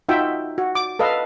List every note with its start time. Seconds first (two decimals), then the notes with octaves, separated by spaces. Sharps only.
0.09 D#4 F4 F#4 E5 G5
0.58 F#4
0.75 D6
0.99 A4 B4 D#5 F5